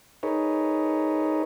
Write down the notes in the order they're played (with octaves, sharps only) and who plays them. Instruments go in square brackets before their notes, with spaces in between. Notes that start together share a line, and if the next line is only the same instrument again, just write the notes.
[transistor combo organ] D#4 G#4 A#4 B4 C#5